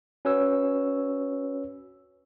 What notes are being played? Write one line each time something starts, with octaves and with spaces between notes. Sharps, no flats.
C#4 F#4 B4 C#5 E6